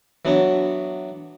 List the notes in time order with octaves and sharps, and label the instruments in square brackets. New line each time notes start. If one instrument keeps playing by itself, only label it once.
[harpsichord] E3 F#3 B3 D4 C#5